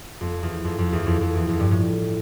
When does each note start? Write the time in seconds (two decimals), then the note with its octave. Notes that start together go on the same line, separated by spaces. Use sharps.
0.21 F2
0.43 E2
0.64 F2
0.78 F2
0.92 E2
1.06 F2
1.20 F2
1.35 E2
1.49 F2
1.60 G2
1.71 A2